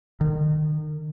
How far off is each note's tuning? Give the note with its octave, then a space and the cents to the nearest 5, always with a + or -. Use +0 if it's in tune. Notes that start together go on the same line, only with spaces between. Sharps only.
D#3 -35